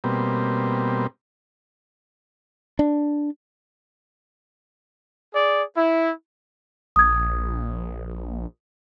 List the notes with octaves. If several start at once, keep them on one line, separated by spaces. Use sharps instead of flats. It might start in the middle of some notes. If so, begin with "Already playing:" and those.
B2 G3 A#3 C4
D4
G#4 D5
E4
A#1 D#6 G#6